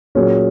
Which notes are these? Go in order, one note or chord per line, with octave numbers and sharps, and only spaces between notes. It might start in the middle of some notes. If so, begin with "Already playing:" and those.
A#2 F#3 C#4 G#4